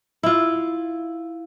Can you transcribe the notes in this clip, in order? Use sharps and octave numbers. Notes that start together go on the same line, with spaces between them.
E4 F4